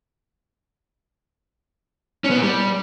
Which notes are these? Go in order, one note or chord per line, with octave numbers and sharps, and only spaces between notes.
C#4
B3
A#2
G3